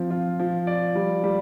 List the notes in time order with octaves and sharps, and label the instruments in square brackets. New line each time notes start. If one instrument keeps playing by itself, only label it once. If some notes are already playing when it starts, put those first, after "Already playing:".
Already playing: [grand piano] F3 C4
F4
F3
D5
G3
G3